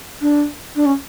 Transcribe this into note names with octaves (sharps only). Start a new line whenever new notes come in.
D4
D4
C#4